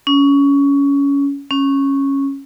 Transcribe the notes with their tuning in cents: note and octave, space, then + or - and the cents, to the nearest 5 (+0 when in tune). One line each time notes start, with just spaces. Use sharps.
C#4 +20
C#4 -10